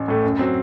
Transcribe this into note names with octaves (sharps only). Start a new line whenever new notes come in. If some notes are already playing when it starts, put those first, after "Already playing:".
Already playing: A1
A2 A3
F#2
F#3 C4